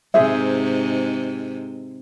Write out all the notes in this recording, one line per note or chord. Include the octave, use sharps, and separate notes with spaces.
G#2 C3 G#4 C5 E5